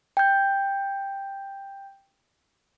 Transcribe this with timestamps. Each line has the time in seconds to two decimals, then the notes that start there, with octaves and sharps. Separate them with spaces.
0.17 G5 G6